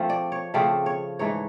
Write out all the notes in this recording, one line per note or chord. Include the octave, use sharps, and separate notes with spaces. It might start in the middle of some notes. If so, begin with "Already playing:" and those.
Already playing: F3 A3 C4
D5
C#5
C#3 F3 A3 C4 D5
C#5
G#2 E3 A3 C#5